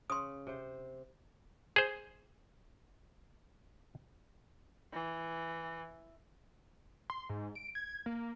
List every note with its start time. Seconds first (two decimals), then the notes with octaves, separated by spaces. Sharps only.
0.10 C#3 C6 D#6
0.47 C3 C5
1.76 G#4 C5
4.93 E3
7.10 C6
7.29 G#2
7.55 D7
7.75 G#6
8.06 A#3